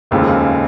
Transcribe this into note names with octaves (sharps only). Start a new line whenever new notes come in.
F1 D#2 C#3 F3 G#3